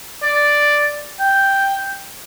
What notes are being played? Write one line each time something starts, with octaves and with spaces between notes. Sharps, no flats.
D5
G5